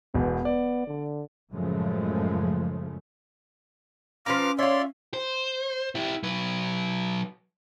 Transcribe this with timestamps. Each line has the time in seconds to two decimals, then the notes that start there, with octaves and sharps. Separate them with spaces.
0.14 E1 E2 B3
0.45 D5
0.87 D3
1.53 F#2 A2 C#3 F3 G#3 A3
4.26 F3 C#4 B4 F5 A#5 D6 F6
4.59 F4 C#5 D5 E5 C6
5.14 C5
5.95 E4 G4
6.23 F#3 B4